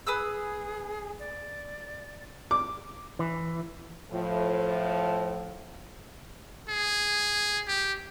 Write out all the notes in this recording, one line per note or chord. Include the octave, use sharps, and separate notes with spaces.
G#4 B4 D#6 E6
D5
D6
E3
A2 F3
G#4
G4